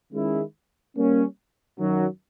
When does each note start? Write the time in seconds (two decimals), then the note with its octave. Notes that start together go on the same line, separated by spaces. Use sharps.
0.13 D#3 G#3 C#4 E4 G#4
0.95 G3 A#3 C#4
1.77 F#2 D#3 F#3